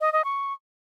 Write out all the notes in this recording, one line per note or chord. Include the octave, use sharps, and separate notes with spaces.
D#5
D#5
C#6